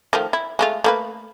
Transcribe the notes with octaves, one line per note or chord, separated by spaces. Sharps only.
D#3 F3 A3
E4
G#3 A3 F4
A3 A#3 B4